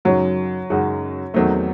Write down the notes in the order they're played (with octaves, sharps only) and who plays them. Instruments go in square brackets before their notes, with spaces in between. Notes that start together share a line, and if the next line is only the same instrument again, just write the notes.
[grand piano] F#2 C#3 G#3 D#4 F#4 [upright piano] F#3
[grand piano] F#2 C#3 G#3 D#4 F#4
[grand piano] E2 D#3 F#3 C4 D#4 [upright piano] A3